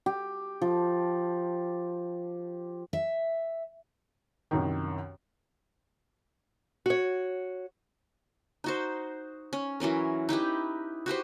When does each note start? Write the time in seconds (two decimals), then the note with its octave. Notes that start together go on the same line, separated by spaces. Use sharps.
0.06 G4
0.61 F3
2.93 E5
4.51 C2 F#2 D#3
6.86 F#4 C#5
8.64 D#4 F#4 C5
9.53 C#4
9.80 E3 F#3 C#4 A#4
10.29 D#4 E4 G4 B4
11.06 F#4 G4 B4 C5